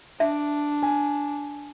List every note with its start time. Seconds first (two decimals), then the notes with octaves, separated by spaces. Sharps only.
0.20 D4 E5
0.83 G#5